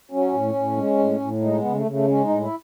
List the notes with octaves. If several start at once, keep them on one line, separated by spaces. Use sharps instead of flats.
F#3 C#4
A2
A2
G#3
A2
A2
G#3 D#4
B3
C#3
A3
C#3 A3
G#3 C#4
D#4
A2
E4